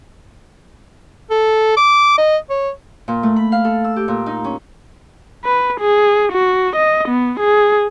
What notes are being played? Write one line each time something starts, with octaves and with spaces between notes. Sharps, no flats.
A4
D6
D#5
C#5
A#2
A3
B5
F5
A4
E6
G4
A#2
D#4
C#4
B4
G#4
F#4
D#5
B3
G#4